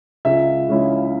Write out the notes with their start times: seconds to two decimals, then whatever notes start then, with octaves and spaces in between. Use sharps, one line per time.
0.25 C#2 E5
0.69 C#3 G#3 C#4 E4